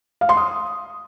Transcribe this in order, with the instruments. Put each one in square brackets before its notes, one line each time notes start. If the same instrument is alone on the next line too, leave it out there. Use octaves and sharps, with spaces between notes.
[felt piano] F5
C6
D#6